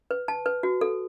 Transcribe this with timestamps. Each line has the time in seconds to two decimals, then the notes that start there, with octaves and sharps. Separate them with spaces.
0.11 B4
0.28 A5
0.46 B4
0.63 F#4
0.81 A4